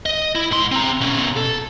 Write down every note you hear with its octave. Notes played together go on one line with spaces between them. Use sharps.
D#5
E4
G#2 C6
C4 A#5
B2 C#4
A4